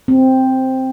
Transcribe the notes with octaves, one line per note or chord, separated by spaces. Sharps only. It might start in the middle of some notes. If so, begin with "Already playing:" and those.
C4